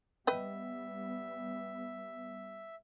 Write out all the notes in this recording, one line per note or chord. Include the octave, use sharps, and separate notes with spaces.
G3 B3 B4 D#5 E5 G5